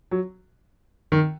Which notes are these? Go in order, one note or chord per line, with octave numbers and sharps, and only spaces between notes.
F#3
D#3